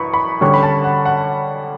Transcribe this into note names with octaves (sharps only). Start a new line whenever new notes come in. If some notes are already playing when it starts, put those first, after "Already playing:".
Already playing: F#2 E3 B5 C#6
B5
D3 G3 C#4 C#6
B5
A5
F#5
F#5